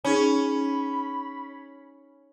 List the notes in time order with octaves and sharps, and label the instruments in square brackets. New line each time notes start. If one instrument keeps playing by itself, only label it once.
[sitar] C#4 [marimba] D#4 G#4 [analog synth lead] B5